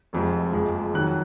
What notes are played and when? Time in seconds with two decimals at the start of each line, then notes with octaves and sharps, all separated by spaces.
0.13 F1 F2 F3 G#3
0.53 F#1 F2 F3 G#3
0.94 F2 D#3 F#3 F#6